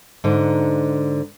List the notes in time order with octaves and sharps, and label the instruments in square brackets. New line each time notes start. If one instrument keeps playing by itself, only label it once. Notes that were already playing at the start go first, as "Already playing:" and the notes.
[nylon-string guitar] G#2 D3 D#4